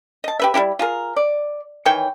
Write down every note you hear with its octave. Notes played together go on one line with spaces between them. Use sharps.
D#5 A5
G4 B4 E5
G3 D#4 E4 G4
F4 G#4 A#4
D5
D#3 E3 C#5 G5